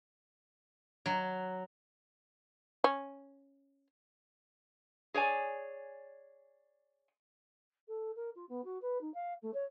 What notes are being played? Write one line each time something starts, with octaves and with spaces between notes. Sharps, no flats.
F#3
C#4
G#4 C#5 D5 G#5
A4
A#4
F4
B3
F#4
B4
D#4
F5
A3
C#5